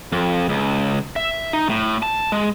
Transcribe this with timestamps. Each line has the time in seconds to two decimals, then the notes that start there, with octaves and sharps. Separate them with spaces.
0.12 F2
0.49 C#2
1.16 E5
1.53 D#4
1.69 A2
2.03 A5
2.32 G#3